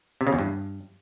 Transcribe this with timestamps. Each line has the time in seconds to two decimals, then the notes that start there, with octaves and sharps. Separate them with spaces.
0.21 C3
0.27 C#3
0.33 E2
0.39 G2